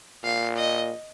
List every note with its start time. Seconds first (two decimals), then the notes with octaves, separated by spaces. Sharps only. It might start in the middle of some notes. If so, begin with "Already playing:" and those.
0.24 A#2 F5
0.56 D#5